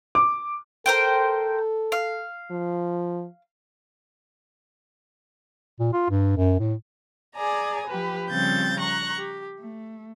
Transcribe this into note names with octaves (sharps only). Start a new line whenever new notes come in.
D6
A4 A#4 C5 G5
F5
F3
A#2
F4
G2
F#2
A2
G#4 D5 G#5 A#5
F3 G4 B4
C#3 F3 G3 C4 G6 A6
A#5 C#6 F#6
G4
A3